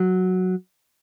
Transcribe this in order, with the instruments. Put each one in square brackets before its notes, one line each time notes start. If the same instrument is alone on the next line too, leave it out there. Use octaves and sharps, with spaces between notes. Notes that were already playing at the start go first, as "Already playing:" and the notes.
Already playing: [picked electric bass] F#3